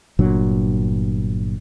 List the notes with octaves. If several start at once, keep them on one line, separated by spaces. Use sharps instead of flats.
G1 A#2 F#3 D4